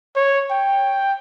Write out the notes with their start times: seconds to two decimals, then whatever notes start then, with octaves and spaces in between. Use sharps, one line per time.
0.16 C#5
0.51 G5